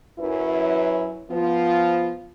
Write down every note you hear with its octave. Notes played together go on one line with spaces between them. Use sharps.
F#2 E4 B4
F3 B3 F4